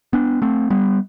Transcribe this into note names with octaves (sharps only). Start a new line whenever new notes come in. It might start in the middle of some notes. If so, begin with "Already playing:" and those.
B3 D4
A3 C4
G3 B3